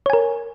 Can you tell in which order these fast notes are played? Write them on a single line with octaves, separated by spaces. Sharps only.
C#5 G#5 A#4